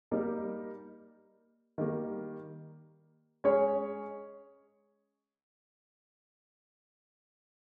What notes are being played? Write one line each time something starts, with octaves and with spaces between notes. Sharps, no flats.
G3 A#3 D#4 G4 A#4
D#3 G3 A#3
G#3 C#4 G#4 C#5